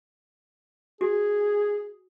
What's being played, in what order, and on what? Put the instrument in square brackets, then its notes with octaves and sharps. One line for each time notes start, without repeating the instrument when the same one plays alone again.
[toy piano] F#4 [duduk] G#4